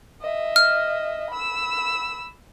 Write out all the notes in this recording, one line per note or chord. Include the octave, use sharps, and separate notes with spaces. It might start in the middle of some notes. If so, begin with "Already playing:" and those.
D#5 E5
F6
B5 E6